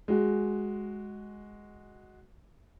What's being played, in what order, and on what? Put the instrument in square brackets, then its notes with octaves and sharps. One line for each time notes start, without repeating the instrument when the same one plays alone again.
[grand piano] G#3 F#4